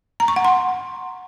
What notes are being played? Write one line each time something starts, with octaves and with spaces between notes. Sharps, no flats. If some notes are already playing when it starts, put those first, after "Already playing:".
A#5
C#6
F#5
C6